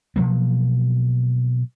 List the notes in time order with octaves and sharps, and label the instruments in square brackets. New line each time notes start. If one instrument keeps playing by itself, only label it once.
[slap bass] B2 F3 F#3 A#3